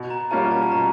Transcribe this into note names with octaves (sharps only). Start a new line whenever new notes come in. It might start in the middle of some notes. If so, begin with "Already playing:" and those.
Already playing: B2
A#5
G3 A#3 C#4 F4 A5
A5
A5
B2 A#5